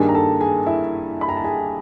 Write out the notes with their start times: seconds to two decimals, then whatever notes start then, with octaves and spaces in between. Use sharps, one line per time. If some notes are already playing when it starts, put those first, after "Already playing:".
Already playing: G2 D#3 G3 A#3 D4 G#4 G#5
0.09 A#5
0.15 A4 A5
0.41 G#4 G#5
0.66 E4 E5
1.21 B5
1.29 A#5
1.37 A5
1.44 G#4 G#5